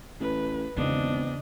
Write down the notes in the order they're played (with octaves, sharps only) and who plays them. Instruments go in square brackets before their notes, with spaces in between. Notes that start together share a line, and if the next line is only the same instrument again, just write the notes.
[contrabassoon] A1 [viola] B4
[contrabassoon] G#1 [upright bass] E2 C#3 [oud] B3 C4 F4 [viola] D4 D#5